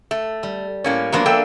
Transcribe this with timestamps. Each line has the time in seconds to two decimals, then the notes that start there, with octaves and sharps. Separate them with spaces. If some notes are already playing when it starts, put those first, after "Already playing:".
0.11 A3
0.43 G3
0.84 A2 A#3 C#4 D5
1.12 F3 F#3 A#3 B3 D4 C5
1.26 B3 A4 E5 G5 G#5